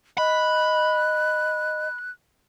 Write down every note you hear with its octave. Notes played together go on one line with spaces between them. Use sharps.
D#5 B5 F#6